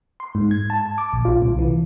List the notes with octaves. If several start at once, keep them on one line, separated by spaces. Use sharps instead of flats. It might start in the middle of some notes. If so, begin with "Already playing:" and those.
C6
G#2
G#6
A5
D6
A#1
F4
C2
E3